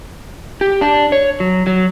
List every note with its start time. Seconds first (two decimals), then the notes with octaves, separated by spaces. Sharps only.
0.61 G4
0.81 D4
1.12 C#5
1.40 F#3
1.67 F#3